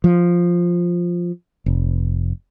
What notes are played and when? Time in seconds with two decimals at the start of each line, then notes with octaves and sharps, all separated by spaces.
0.04 F3
1.66 F1